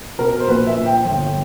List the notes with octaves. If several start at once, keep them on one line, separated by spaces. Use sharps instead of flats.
B2 A#4
C5
A#1 B4
E5
A#2
G5
G1